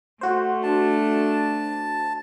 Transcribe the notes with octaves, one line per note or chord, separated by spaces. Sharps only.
A3 F#4 C5
D4 A5